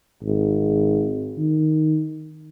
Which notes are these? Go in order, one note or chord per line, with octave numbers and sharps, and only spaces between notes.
G#1
D#3